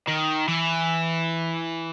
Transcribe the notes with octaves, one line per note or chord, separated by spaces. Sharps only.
D#3
E3